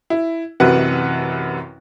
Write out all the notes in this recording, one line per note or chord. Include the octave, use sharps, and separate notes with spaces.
E4
A1 F#2 C3 B4 F#5